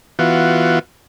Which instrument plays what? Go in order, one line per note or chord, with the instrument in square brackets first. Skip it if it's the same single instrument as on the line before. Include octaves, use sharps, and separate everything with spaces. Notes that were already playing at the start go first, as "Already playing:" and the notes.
[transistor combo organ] E3 B3 F4 F#4